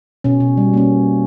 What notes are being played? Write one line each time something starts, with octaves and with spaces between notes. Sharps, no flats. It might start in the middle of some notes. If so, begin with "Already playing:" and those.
B2 C#4
B2
G3
A#3 C#4